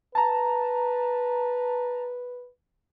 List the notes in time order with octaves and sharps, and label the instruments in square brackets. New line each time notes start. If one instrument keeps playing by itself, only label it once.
[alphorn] B4 [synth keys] A5 A#5